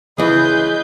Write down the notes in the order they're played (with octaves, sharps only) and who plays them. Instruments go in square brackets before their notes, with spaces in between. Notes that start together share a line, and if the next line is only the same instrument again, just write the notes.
[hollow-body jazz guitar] C#2 E3 [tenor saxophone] G#4 [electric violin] B4 G6 [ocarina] D#5